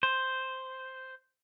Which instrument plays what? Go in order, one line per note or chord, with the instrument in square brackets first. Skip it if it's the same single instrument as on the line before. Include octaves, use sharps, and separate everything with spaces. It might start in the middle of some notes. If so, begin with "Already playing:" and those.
[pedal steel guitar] C5